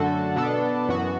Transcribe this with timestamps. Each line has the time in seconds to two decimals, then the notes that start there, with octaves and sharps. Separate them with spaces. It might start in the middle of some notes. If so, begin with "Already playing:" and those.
Already playing: F#2 D3 A3 F#4 A4
0.36 B2 B3 D4 A4
0.89 F#2 E3 B3 F#4